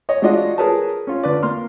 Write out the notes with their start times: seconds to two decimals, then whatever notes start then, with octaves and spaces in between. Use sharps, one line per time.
0.09 C#5 D#5
0.22 G#3 D4 F4 F#4 D#5
0.58 G#4 A#4 B4 C#5 A5
1.07 C#4 F4
1.23 D3 B4 D5
1.43 A#3 C6 F6